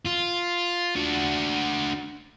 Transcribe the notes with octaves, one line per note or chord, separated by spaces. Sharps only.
F4
D4 F#4